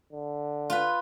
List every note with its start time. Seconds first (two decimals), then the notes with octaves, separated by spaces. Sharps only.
0.13 D3
0.70 F4 B4